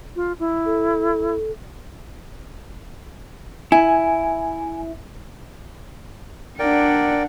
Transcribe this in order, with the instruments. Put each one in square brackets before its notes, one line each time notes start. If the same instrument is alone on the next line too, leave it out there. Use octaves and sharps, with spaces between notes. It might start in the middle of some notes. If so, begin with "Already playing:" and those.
[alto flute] F4
E4
[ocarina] A4
[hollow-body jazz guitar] E4 [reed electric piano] G#5
[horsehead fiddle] D4 F#5 [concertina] A#4 D5 G5